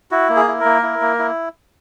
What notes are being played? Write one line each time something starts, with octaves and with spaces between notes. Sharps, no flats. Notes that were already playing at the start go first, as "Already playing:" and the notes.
E4 F#4
A#3
G#4
E4
A#3 A#4
E4
A#3
E4